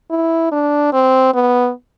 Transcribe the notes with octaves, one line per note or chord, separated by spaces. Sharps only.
E4
D4
C4
B3